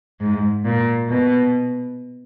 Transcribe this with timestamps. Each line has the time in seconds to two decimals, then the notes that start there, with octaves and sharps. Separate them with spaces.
0.20 G#2
0.64 A#2
1.09 B2